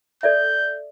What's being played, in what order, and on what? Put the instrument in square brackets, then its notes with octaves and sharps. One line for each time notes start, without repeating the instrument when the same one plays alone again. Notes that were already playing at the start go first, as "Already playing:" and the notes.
[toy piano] A4 D5 E5 [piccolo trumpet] G6